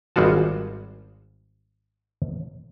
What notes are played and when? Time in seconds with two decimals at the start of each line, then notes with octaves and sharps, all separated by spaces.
0.16 G#1 G3 G#3 F4 F#4 A5